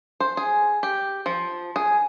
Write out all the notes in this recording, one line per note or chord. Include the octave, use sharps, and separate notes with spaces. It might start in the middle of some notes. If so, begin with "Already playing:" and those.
C5
G#4
G4
F3
G#4